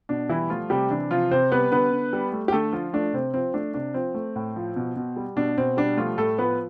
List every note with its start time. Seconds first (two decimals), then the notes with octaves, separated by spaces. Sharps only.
0.09 B2 D4
0.29 E3 G3 E4
0.50 F3 A3 F4
0.70 C3 G3 G4
0.90 E3 D4
1.11 C3 F3 F4
1.31 C3 C4 C5
1.52 G3 B3 B4
1.71 D3 B3 B4
1.92 D3
2.13 G3
2.33 A3
2.48 G4
2.52 D3 A3 A4
2.73 F3 F4
2.93 A3 D4
3.13 C3 C4
3.34 F3 C4
3.54 A3 D4
3.74 C3 D4
3.94 F3 C4
4.15 A3
4.36 A2
4.56 F3
4.76 B2
4.96 B2
5.16 G3
5.36 B2 D4
5.58 B2 C4
5.77 G3 D4
5.97 F3 A3 F4
6.17 A2 A3 A4
6.38 F3 B3 B4